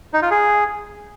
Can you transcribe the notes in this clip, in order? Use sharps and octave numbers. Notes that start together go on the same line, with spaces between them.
D#4
F4
G#4